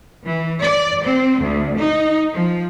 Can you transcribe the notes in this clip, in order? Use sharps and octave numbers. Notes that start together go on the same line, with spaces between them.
E3
D5
C4
D2
D#4
F3